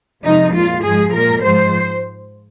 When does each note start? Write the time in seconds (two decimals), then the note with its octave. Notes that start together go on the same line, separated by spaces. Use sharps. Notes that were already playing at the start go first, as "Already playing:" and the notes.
0.24 F2 C3 F3 G#3 D#4
0.54 A#2 G#3 F4
0.83 G#2 F3 G#3 G#4
1.12 A#2 G#3 A#4
1.42 G#2 F3 G#3 C5